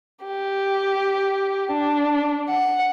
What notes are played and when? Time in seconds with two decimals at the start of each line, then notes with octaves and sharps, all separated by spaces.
0.24 G4
1.72 D4
2.50 F#5